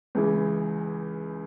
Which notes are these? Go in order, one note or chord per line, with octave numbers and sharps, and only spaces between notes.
C#2 C#3 E3